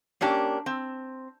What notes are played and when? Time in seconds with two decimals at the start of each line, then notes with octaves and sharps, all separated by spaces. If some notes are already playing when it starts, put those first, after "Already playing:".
0.21 A#3 C#4 D4 G4
0.66 C4